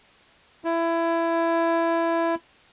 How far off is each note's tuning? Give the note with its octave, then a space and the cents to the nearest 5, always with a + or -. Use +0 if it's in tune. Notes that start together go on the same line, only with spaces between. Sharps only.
E4 +20